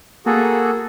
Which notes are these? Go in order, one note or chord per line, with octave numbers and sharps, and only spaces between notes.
A#3 F#4 G#4 A4